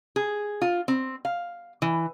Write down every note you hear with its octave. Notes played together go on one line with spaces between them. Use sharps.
G#4
F4
C4
F5
E3